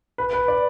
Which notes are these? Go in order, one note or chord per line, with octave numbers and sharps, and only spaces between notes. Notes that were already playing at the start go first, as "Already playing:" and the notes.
B4
B4
D5